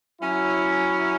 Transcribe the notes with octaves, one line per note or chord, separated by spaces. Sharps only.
F#3 C#4 E4